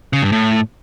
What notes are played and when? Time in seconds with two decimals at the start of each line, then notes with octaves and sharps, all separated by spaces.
0.13 C#3
0.23 G2
0.32 A2